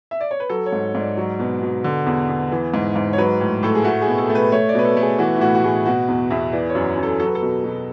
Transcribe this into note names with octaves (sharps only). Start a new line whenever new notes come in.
E5
D5
C#5
B4
F#3 A4
C#5
G#2
G#2
D5
F#3
B2
B2
D3
E2
E2
E3
G#2
G#2
C#5
F#3 B4
A2
A2 A4
G#4
A3 F#4
G#4
B2
A4
A3
B4
A3 C#5
D5
B2 B4
A4
A3
G#4
E3 F#4
E4
A2 F#4
F#4
A2 G#4
B2 F#4
E2
E2 E5
E3 D5
C#5
F#2
F#2
A4
F#3 A4
B4
A4
B2
B2